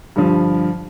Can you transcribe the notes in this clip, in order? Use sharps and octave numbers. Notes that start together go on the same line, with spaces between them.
G2 D3 F3